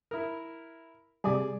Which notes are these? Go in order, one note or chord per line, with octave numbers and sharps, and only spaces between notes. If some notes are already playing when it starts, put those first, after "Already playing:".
E4 A#4
C3 G3 G#4 D5